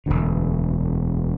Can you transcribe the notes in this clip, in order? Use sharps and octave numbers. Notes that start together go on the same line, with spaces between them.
E1 D2 D3